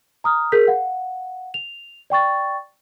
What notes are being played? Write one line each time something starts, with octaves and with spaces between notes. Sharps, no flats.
A#5 D#6 F6
G#4 A#4 G6 B6
F5 F#5
F7
D5 G5 C#6 A6